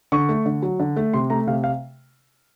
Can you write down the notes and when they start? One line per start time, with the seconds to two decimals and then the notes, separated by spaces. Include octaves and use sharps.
0.12 D3 C#6
0.29 A3
0.46 D3
0.62 F#3
0.80 D3
0.97 A3
1.14 C3 C6
1.30 A3 A#5
1.47 C3 F5
1.64 F5